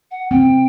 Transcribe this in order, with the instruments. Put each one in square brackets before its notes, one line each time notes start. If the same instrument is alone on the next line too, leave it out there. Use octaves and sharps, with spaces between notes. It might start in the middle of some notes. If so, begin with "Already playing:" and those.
[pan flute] F#5
[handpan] C4 [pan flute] G5